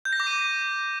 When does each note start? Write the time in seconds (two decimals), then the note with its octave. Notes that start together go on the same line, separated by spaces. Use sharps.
0.05 G6
0.13 A#6
0.20 D6
0.27 D#7